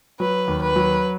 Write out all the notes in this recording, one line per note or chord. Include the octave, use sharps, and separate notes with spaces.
F#3 B4
D#2
B4
F#3